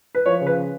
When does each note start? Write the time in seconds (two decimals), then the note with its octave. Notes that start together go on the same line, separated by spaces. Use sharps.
0.15 B4
0.26 F3 C#5
0.41 C#3
0.46 B4